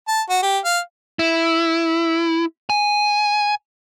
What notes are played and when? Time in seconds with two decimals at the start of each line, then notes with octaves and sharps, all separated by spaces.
0.08 A5
0.30 F#4
0.43 G4
0.65 F5
1.19 E4
2.70 G#5